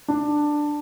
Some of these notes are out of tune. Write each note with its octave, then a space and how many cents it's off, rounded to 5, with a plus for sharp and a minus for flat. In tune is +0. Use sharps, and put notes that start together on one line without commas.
D4 +10